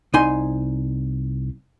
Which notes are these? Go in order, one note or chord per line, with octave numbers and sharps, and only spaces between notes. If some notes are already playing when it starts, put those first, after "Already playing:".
C2 D#4 G#5 C6